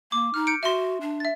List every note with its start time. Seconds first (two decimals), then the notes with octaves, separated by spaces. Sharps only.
0.12 A#3 D6
0.34 D#4 F6
0.47 G6 C#7 D7
0.63 F#4 E5 C6
1.01 D4
1.20 E5 A6